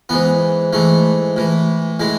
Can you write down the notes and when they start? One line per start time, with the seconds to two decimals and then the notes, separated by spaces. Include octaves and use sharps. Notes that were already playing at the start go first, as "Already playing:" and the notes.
0.09 G#2 E3 B3
0.73 G#2 E3 A3
1.36 A2 E3
2.00 A2 E3 G#3